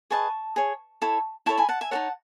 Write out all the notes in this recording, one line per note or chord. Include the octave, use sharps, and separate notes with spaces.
G#4 B4 D#5 A5 C#6
G#4 C#5
E4 A4 C#5
E4 A4 C#5 A5 C#6
G#5 B5
F#5 A5
E5 G#5
D#4 A4 C#5 F#5 A5